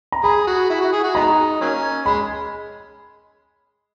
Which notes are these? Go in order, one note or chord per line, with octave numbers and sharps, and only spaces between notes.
A#5
G#4 B5
F#4
E4
F#4
G#4
F#4
G#3 B3 D#4 A#5
F#3 A#3 C#4
G#3 B5